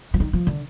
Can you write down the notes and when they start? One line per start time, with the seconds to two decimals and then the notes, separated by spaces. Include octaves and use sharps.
0.14 F3
0.20 D#3
0.33 F3
0.47 D3